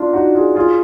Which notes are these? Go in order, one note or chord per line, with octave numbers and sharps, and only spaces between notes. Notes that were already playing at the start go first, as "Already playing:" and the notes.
Already playing: D4 F4
D#4 F#4
F4 G#4
F4 G#4